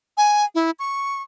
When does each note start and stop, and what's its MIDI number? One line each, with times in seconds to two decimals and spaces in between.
0.17 0.45 80
0.55 0.71 64
0.79 1.22 85